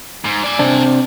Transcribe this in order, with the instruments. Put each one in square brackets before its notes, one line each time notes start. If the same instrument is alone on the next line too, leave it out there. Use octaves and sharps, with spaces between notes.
[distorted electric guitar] G#2
D5 G#5
[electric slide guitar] C3 C4 D4